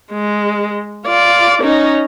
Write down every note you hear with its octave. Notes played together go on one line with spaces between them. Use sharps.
G#3
F4 D5
C#4 D#4